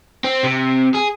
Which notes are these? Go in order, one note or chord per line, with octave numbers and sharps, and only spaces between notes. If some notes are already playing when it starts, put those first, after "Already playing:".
C4
C3
G#4